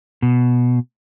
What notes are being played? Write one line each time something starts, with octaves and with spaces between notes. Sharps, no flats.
B2